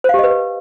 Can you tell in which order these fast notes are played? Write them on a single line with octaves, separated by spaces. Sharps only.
C5 F5 G4 D#5 B4